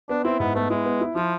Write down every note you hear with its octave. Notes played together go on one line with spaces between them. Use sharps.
B3 D4
C4 E4
G#2 B3
A3 B3
G#3 E4
B3
E4
F3 E4